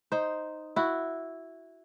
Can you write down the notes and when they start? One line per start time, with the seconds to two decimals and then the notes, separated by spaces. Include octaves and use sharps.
0.12 D#4 C5
0.76 E4 F#4